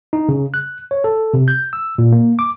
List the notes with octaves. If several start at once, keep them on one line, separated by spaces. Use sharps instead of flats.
D#4
C#3
F#6
C#5
A4
C3
G6
E6
A#2
A#3
D6